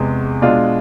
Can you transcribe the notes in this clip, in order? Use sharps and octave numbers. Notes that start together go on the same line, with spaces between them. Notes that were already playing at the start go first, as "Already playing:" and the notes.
Already playing: E2 C3 G#3
B2 G#3 D4 F4